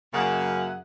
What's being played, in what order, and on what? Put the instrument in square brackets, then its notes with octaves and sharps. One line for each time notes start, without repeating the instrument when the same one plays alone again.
[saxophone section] F#2 C#3 A#3 G#4 E5 F#5